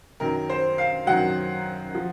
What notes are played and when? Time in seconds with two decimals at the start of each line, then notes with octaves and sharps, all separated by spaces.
0.20 F#2 D#3 F#3 A#4
0.50 C5
0.78 F5
1.06 F#2 D#3 F#3 F#5
1.95 F3